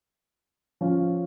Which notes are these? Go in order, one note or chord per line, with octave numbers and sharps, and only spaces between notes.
F3 C#4 F4